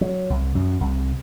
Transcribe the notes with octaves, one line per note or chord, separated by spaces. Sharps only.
F#3
C2
F#2
C2